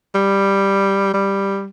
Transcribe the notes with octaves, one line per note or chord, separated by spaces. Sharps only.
G3
G3